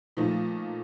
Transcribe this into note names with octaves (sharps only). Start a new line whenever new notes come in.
A#2 F3 A3 D#4